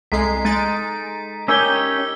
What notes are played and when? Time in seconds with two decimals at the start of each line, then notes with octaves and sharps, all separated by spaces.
0.12 C2 G#3 A4 A#5 B6 C7
0.45 G#3 D#4 A6 D7
1.48 C#4 D#4 G4 A#4 G#5 E6 G#6 G7